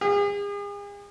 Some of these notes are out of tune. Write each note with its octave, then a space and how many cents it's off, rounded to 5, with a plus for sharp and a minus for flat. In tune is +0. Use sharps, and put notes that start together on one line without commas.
G#4 -40